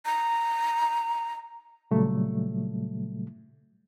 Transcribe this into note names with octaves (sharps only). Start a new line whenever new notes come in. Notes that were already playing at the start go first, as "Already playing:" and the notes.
A#5
A#2 C#3 F#3 G3 A3